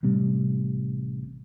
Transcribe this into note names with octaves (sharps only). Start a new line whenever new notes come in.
A1 C3 G3